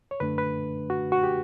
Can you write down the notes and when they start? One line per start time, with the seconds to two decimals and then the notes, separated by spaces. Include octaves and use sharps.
0.11 C#5
0.20 F#2 D3 A3 D4 B4
0.38 B4
0.90 F#4
1.12 F#4
1.23 G4